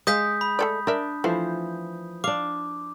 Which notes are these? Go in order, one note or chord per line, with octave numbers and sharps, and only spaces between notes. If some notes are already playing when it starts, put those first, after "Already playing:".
G#3 D#5 F5 D#6 G6 B6
B5
A3 A4 D5
D4 A#4 E5
E3 F3 A3 C5
D4 F5 D6